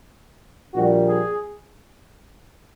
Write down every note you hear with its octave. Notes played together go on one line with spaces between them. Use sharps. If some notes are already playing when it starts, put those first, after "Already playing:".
A#1 A#2 G3 F#4
G#4